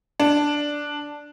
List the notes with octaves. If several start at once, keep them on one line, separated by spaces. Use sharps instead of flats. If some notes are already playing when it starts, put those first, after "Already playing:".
D4